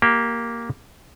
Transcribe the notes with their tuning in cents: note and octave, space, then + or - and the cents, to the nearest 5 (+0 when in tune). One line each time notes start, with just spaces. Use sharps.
A#3 +0 G4 -10